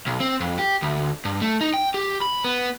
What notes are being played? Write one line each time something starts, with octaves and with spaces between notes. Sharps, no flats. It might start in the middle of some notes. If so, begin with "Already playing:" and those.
B1
C4
F2
G4
D2
G2
A3
D#4
G5
G4
B5
B3